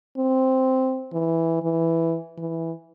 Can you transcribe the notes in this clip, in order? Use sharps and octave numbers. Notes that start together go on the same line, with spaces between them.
C4
E3
E3
E3